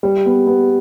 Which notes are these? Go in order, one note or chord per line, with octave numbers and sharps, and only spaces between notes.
G3
B3
B3